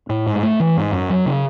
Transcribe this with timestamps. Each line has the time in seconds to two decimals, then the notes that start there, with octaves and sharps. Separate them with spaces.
0.09 A2
0.27 G#2
0.43 A3
0.60 E3
0.77 G#2
0.92 F#2
1.10 F#3
1.26 C#3